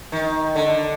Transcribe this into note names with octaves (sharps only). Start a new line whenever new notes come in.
D#3
D3